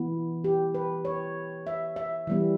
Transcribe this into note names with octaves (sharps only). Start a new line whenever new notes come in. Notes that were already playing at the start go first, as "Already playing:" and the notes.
Already playing: E3 B3
G4
B4
C#5
E5
E5
E3 G3 B3